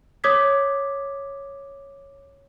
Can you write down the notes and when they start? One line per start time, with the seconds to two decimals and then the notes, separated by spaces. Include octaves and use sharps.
0.24 C#5 D6 D#6 G#6 B6